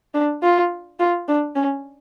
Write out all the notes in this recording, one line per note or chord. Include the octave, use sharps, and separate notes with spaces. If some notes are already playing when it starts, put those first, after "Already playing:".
D4
F4
F4
D4
C#4